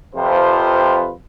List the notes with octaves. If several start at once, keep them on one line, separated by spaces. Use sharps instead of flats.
F2 C3 F3 F4 B4 C5